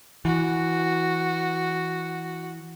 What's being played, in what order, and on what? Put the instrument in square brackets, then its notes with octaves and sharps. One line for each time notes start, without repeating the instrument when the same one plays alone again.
[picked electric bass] E3 [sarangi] F#4